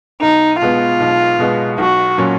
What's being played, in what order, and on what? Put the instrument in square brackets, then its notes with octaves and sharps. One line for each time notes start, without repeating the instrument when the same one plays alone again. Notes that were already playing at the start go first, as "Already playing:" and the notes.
[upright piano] B1 [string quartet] D#4
[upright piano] B2 G#3 B3 [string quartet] F4
[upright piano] B1
B2 G#3 B3
[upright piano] B1 [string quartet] F#4
[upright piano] A#2 F#3 C#4